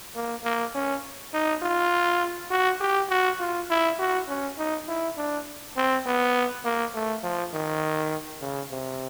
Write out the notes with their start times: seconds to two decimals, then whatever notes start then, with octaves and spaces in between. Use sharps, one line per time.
0.15 A#3
0.44 A#3
0.74 C#4
1.34 D#4
1.62 F4
2.51 F#4
2.81 G4
3.10 F#4
3.39 F4
3.70 E4
3.99 F#4
4.28 C#4
4.58 D#4
4.88 E4
5.18 D4
5.76 C4
6.06 B3
6.65 A#3
6.94 A3
7.23 F3
7.54 D#3
8.41 C#3
8.71 C3